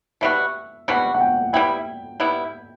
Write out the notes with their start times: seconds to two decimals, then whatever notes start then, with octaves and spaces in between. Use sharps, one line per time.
0.21 B2 G3 B3 F#4 E5
0.88 B2 G3 B3 F#4 F#5
1.14 F#5
1.20 G5
1.53 G3 B3 E4 G5
2.20 G3 B3 E4